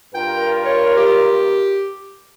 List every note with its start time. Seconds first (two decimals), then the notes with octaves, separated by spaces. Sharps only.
0.14 G2 F4 A#4 G5
0.65 C#5
0.96 G4